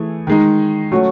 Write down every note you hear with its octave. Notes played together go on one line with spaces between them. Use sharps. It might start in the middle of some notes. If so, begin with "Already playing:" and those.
Already playing: E3 A3 E4 G#4
D#3 G#3 D#4
F#3 A3 C#4 F#4